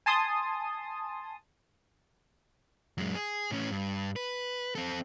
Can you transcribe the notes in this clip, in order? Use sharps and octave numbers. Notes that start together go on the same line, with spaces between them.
G#5 A5 C6 D#6
F#2 G#3
G#4
A2 C#4
G2
B4
C4 A4